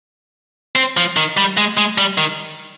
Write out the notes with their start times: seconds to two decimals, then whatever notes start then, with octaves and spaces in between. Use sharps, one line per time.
0.76 C4
0.97 F3
1.17 D#3
1.37 G3
1.57 G#3
1.77 G#3
1.98 G3
2.18 D#3